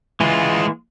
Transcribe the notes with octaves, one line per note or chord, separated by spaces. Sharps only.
E3 G#3 F4